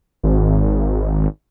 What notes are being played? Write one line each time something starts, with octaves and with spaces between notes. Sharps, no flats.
G#1